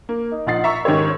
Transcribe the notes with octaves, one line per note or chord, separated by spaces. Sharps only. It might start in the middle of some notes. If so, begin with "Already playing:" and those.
A#3
D#4
A#1 D#4 F4 F#5 A6 C7
E5 A#5 C#6 E6
G#2 D#3 C#4 G4 C#5